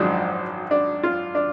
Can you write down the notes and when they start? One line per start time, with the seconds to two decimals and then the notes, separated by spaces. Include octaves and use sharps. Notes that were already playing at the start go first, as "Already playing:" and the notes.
Already playing: G#1 F#2 F3 G#3 D4
0.71 D4
1.03 F4
1.35 D4